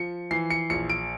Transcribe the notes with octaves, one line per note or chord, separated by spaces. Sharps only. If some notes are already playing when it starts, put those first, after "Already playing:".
Already playing: F3 C#7
E3 C7
C#7
A#1 C#7
D7